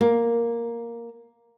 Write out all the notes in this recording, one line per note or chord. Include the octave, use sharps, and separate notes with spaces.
A#3